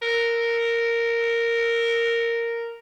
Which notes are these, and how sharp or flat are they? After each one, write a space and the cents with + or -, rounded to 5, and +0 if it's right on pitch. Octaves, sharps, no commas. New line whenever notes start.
A#4 -5